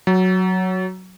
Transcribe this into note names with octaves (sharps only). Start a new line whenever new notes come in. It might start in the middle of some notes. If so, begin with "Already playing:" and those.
F#3